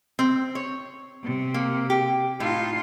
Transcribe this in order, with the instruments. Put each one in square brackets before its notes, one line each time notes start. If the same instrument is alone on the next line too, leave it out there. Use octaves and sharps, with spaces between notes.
[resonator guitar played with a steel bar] C4
C#5
[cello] C3
[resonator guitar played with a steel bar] A#3
G4
[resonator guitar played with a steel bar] A2 [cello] D#4 F4